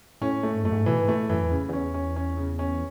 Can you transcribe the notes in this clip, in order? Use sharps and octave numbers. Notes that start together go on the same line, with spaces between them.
A2 C#4
A3
G#2
F#2 A3
G#2
B2 E3
G#2
A2 A3
F#2 E3
E2
C#3
E2 C#4
C#4
C#4
C#3
C#4